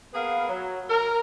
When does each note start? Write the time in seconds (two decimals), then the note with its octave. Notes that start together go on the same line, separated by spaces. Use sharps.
0.13 A#3 B3 G#4 A#4 B4 F5
0.48 F#3
0.89 A#4